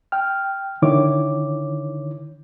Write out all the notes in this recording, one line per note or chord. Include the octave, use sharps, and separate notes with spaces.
G5 F6
D3 D#3 E4 C#5 D6